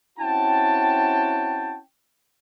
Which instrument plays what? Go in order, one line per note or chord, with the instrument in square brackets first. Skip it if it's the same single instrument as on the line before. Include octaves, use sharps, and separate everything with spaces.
[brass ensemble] C4 C#4 E4 F#4 G5 A5